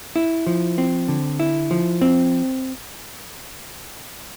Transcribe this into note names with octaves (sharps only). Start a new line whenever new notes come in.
E4
F3
C4
D3
E4
F3
C4